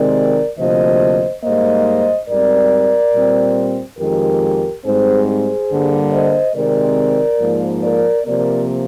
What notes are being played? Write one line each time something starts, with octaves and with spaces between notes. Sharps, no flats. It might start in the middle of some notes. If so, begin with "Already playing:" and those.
Already playing: C3 D#3 G#3 C4 A#4 D5
D2 C3 F3 A#3 C5 D#5
G#2 G3 A#3 C5 D#5
G#2 G3 C4 A#4 D5
A#2 G3 C4
F2 D#3 G#3 G4 A#4
G#2 G3 C4 G#4 C5
G#4 C5
G2 D3 G3 A#3
C5 D#5
C3 D#3 G#3 C4 A#4 D5
G#2 F3 A#3
A#4 D5
C3 F3 A#3 A#4 D5